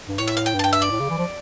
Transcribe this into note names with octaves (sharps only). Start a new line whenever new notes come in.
G2
A2 C#5
E5
F5
G5
G2 A5
G5
E5
D5
A2
C#3
E3
F3